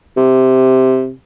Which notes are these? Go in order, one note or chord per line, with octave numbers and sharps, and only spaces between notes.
C3